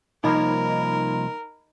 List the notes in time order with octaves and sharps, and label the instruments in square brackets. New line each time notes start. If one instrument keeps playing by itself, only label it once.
[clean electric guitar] C2 F3 A#3 [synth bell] D#4 D#5 B5 [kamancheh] A#4